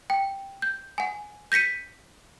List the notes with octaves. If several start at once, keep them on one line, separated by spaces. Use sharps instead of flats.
G5
G6
F#5 G#5
G6 A#6 B6 C#7 D#7